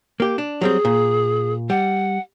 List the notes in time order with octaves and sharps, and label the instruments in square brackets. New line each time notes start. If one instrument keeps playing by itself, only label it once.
[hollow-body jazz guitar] A#3 G4
D4
[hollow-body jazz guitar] F#3 G3 C4 [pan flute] G#4
[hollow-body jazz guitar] A#2
[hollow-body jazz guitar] G3 [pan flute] F#5